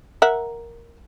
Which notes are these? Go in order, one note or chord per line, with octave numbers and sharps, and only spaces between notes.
A#4 E5 F#5